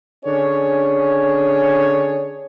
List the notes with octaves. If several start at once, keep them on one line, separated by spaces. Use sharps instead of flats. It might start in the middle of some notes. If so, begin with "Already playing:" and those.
D3 C#4 D4 G#4 C#5